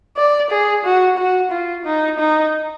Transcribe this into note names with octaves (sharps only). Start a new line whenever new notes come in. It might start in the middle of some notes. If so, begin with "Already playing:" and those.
D5
G#4
F#4
F#4
F4
D#4
D#4